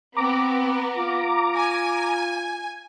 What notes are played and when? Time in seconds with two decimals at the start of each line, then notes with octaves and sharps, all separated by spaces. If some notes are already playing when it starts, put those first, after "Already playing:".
0.17 B3 C4 A#5 D6
0.96 F4
1.57 G#5